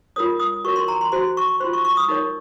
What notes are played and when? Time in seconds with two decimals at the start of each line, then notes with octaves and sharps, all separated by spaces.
0.16 F4 A#4 C#5 D#6
0.40 D#6
0.64 F#4 A#4 C#5 C#6
0.76 C6
0.88 A#5
1.01 C6
1.12 F#4 C5 C6
1.37 C#6
1.60 C5 C6
1.64 F4
1.73 C#6
1.85 C#6
1.97 D#6
2.08 D#4 A#4 C#5 C#6